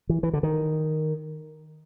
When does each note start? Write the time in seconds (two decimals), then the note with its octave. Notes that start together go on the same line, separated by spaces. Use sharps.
0.09 E3
0.23 E3
0.33 D3
0.43 D#3